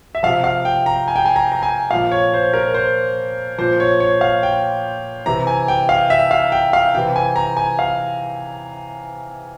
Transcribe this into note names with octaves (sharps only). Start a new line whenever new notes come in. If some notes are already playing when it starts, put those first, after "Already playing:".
E5
C3 F3 F5
F5
G5
A#5
G#5
G5
G#5
A#5
A#5
G#5
A#2 F3 F5
C#5
C5
A#4
C5
A#2 F3 C5
C#5
C#5
F5
G5
C3 E3 A#5
G#5
G5
F5
E5
F5
G5
F5
C3 E3 G5
G#5
A#5
G#5
F5